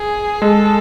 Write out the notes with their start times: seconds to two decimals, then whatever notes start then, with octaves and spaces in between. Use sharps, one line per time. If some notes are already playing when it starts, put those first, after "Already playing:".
Already playing: G#4
0.42 G#3 A4